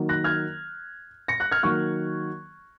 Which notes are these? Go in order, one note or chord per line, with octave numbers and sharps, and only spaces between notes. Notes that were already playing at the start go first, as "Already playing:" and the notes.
Already playing: D#3 F#3 A#3
F#6 A#6
F6 G#6
A#6 C#7
F#6 A#6
F6 G#6
D#3 F#3 A#3 C#6 F6